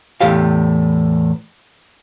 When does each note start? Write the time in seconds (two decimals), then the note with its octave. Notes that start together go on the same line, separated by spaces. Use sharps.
0.21 E2 A2 G4 F5